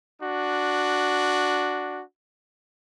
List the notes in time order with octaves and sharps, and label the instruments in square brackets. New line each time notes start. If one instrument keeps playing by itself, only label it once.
[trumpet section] D4 F#4